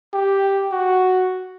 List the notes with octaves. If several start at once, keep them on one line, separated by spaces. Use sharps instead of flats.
G4
F#4